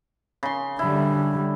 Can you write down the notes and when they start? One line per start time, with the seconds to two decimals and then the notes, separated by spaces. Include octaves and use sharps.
0.43 C#3 C6
0.79 D3 G3 E4